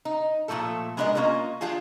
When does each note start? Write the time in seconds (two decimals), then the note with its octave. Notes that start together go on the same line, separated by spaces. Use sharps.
0.05 D#4
0.48 A#2 C#3 F3 A3 A4
0.97 G#3 B3 D4 A#4 D#5
1.15 A#3 C#4 F4 A#4 D#5
1.61 F3 D4 F4 G4 G#4